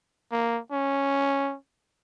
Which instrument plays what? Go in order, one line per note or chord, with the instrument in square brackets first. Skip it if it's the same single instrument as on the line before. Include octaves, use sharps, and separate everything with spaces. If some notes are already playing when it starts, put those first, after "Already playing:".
[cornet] A#3
C#4